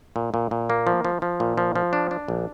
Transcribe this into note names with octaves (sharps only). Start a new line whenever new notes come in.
A#2
A#2
A#2
A#3
F3
F3
F3
A#2
F3
F3
D4
D4
A#1